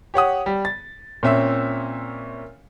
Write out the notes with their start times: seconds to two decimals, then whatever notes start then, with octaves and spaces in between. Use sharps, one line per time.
0.14 G4 C#5 F#5 D#6
0.46 G3
0.65 A6
1.23 A#2 C4 C#4 E5 E6